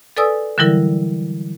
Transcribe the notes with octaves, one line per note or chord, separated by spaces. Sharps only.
A4 B4 D5 G#5 D#6 E6
D3 E3 F#3 G3 E4 A#4